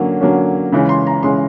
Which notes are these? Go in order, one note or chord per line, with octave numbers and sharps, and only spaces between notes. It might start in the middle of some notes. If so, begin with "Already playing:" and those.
Already playing: D3 F#3 A#3 C#4
D3 F#3 A#3 C#4
C#3 E3 G#3 C#4
C6
A#5
C#3 E3 G#3 C#4 C6